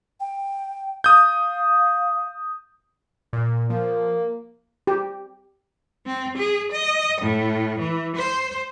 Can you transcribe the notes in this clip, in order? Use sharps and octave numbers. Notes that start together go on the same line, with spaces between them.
G5
F5 D#6 G6
A#2
F3 A#3
G4
C4
G#4
D#5
A2
E3
C5